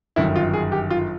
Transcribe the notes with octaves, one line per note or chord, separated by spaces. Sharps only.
G1 F#2 D#3 E4
F4
G#4
G4
F4